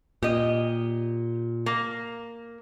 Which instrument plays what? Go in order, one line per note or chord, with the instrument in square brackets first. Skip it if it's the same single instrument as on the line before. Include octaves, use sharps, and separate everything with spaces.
[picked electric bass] A#2 [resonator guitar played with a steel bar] G4 D#5
[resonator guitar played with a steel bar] A#3